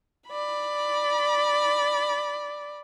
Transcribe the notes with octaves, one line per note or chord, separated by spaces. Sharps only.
D5 B5